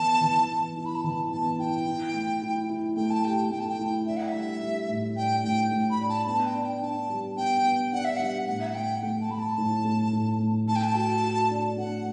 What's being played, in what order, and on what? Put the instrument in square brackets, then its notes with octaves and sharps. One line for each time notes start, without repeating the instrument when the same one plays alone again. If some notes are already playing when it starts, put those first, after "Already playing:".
Already playing: [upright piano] E3 B3 [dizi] A5
[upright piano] E3
B3
[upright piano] E4 [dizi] A5
[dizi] B5
A5
[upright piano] E3
[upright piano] B3 [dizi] A5
[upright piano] E4 [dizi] G5
[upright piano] E4
A3
E4
E4
[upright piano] A3 [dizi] G5
[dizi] A5
[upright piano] G4 [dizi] G5
[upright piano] A3 [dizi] G5
[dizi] A5
G5
[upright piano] E4
[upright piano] D4 [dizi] E5
[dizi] F#5
E5
[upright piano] G3
G3
A2
[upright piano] D4 [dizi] G5
[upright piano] A2 [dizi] G5
[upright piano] A2
[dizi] B5
[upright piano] D4
[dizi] A5
[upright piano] B3 [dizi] A5
[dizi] G5
[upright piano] D4
[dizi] G5
[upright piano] D4 [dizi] A5
[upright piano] G3
[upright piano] B3 [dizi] G5
[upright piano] B3
[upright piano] D4 [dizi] F#5
[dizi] E5
[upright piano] G3 [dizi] F#5
[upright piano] A2 [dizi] F#5
[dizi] E5
F#5
[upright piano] A3 [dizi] G5
[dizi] F#5
[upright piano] A3 [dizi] G5
[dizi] A5
[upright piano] A3 [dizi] B5
[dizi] A5
[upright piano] A2
A3
A2
A3
[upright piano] A3 [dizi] A5
[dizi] G5
A5
[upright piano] F#4
F#4
D4
[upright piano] A3 [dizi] F#5